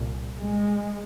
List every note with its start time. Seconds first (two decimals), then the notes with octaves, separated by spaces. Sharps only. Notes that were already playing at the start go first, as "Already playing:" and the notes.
Already playing: C2 A#2
0.39 G#3